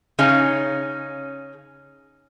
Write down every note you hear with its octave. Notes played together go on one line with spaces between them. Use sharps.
C#3 C#4 D#4 G#4